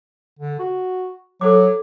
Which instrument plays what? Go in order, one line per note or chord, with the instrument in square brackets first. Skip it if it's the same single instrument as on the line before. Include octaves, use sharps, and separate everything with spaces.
[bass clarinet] D3
F#4
[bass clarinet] F#3 [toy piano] A4 C5 D6